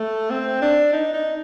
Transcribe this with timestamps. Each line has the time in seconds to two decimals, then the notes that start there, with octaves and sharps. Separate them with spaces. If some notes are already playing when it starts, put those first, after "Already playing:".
Already playing: A3
0.30 C4
0.62 D4
0.93 D#4
1.14 D#4